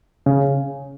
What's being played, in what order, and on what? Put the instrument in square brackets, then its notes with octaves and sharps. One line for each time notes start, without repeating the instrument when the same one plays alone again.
[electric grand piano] C#3